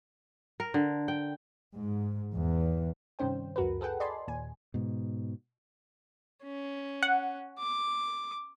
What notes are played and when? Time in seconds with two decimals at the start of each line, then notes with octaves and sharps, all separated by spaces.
0.60 A#4
0.74 D3
1.08 G5
1.73 G#2
2.35 E2
3.19 G2 C3 D#3 C#4 C5 G5
3.56 C#2 F#2 F#4 A#4 B4
3.81 G#4 A4 B4 F#5 G5
4.00 D5 D#5 G#5 A5 B5 C6
4.27 D#2 A#2 G#5
4.74 G#2 B2
6.44 C#4
7.03 F#5
7.59 D6